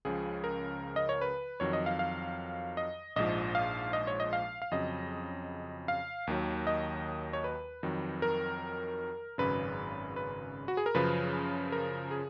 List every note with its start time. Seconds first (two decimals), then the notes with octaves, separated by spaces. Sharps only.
0.05 C#2 C#3 F3 G#4
0.44 A#4
0.96 D#5
1.09 C#5
1.21 B4
1.60 F2 D#3 F#3 C#5
1.73 D#5
1.86 F5
1.99 F5
2.77 D#5
3.16 A#1 G#2 F3 D#5
3.55 F5
3.93 D#5
4.07 C#5
4.20 D#5
4.33 F5
4.62 F5
4.71 F2 C#3 F#3 D#5
5.88 F5
6.27 D#2 D#3 F#3
6.67 D#5
7.33 C#5
7.44 B4
7.83 F2 D#3 F#3
8.22 A#4
9.38 G#1 F#2 C#3 B4
10.16 B4
10.68 F#4
10.77 G#4
10.86 A#4
10.94 F#2 C#3 F3 B4
11.72 A#4
12.11 G#4